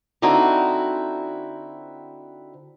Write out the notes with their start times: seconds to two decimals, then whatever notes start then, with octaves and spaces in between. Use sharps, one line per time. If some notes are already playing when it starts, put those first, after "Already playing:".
0.22 D3 C4 D#4 E4 F#4